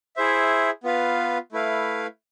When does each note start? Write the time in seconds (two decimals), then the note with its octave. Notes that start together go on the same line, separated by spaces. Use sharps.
0.16 E4 G#4 C5 E5
0.83 B3 F4 B4 F5
1.52 A3 E4 B4 F5